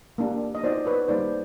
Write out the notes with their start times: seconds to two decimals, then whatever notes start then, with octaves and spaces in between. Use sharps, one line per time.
0.18 A#3 D4 G4
0.55 D#5
0.63 B3 D#4 F#4 C5 D5
0.86 B4 C#5
1.08 G3 A#3 D#4 C5 D5